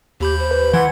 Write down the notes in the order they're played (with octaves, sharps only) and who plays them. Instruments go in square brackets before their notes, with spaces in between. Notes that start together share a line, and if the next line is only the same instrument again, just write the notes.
[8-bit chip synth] D#2 B5 G6 [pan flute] G4
[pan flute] C5
[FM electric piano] B4
[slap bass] E3 [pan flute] F#5 [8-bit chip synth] C6 G#6